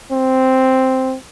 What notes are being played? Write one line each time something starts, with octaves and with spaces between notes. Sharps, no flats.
C4